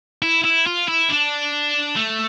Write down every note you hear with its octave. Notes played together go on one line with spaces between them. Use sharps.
E4
E4
F4
E4
D4
A3